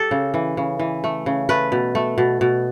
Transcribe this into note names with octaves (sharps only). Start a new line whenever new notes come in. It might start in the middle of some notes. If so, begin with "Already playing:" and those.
Already playing: G4 A4
C#3
E3
C#3
E3
A3
C#3
A3 B4
B2
A3
B2
B2